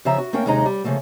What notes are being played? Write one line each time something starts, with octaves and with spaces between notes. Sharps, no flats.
C#3 F3 E5 A#5
F#4
A3 A#3 C#4 A#4 G5
D#2 C3 G#3 D#4 A#5
G3
C#3 F3 A3 A#3